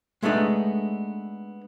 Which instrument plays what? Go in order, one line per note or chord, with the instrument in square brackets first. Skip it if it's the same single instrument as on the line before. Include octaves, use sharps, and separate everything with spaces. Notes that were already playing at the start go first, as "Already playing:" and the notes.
[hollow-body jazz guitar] G#3 A3 B3 D4 D#4